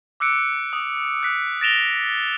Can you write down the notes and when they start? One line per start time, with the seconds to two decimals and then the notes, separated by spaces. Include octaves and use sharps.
0.20 D6 E6 F#6 C#7 D7
0.73 D#6
1.23 F#6 B6
1.61 A6 A#6 D7 E7 F7 G7